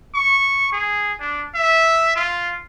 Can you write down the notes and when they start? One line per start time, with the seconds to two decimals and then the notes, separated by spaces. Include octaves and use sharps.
0.15 C#6
0.72 G#4
1.20 D4
1.55 E5
2.16 F4